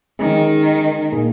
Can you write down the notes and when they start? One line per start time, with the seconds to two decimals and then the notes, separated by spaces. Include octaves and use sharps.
0.19 D#3 G#3 C#4 G#4
1.12 A#2 A#3 D#4 G#4